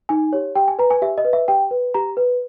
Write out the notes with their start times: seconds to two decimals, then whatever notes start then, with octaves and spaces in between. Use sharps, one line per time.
0.09 D#4 G#5
0.33 G4 C#5
0.55 G4 G5
0.68 G#5
0.79 B4 A#5
0.90 G#5
1.02 G4 E5
1.18 D#5
1.25 B4
1.33 E5
1.48 G4 G5
1.71 B4
1.94 G4 A#5
2.17 B4